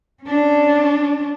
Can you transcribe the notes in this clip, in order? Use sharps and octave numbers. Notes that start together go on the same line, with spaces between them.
C#4 D4